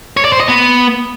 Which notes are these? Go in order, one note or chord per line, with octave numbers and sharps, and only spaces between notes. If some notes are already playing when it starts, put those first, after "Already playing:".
C#5
D5
C5
D#5
B3